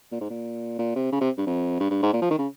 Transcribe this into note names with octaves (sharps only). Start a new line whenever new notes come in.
A#2
G#2
A#2
A#2
C3
C#3
C3
G2
F2
G2
G2
G#2
A#2
F3
D#3
C#3